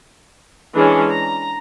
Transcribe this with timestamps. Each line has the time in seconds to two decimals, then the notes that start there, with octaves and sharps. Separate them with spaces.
0.76 E3 G#3 C#4 D4 G#4
1.07 A#5